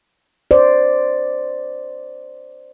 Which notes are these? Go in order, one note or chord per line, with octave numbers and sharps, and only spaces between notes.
C5 D5